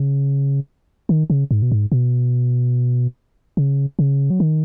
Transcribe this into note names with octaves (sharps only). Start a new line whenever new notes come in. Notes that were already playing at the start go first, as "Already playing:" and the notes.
Already playing: C#3
D#3
C#3
G#2
B2
G#2
B2
C#3
C#3
F#3
D#3